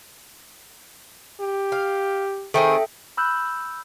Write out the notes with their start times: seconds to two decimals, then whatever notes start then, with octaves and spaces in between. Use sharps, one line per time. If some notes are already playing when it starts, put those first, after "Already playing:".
1.41 G4
1.72 F5
2.54 D#3 C4 G#4 A4 E5 G5
3.17 B5 E6 F#6 G6